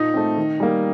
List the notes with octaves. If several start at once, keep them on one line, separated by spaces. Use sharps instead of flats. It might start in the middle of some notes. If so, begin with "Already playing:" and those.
Already playing: A#2 D#4
A3 C4
D#3
G3 A#3